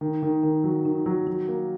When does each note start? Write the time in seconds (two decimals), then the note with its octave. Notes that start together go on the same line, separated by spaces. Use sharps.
0.01 D#3
0.23 D#3
0.43 D#3
0.64 F#3
0.85 D#3
1.06 F#3
1.27 F#3
1.48 A#3